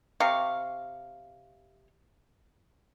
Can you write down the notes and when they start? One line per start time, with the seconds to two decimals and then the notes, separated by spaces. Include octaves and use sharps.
0.20 C3 F5 C#6